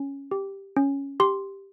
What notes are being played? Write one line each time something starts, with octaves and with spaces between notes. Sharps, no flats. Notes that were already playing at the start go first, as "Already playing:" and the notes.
Already playing: C#4
G4
C#4
G4 C6